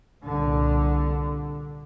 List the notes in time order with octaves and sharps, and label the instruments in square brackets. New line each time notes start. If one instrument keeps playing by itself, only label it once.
[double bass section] C2 A#2 D3